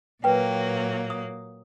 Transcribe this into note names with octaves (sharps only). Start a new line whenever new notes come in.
A#2 F#3 A#3 B4 G5
D#6